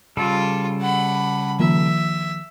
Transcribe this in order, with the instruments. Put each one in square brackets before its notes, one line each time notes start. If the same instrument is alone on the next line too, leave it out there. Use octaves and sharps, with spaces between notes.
[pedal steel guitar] C#3 G3 A4 [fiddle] F4
[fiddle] F#5 B5
[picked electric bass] D#3 F3 A#3 [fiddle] E5